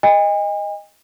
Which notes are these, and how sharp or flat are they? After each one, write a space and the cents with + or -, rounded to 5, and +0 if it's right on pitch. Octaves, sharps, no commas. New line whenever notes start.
D#5 +0 G#5 -45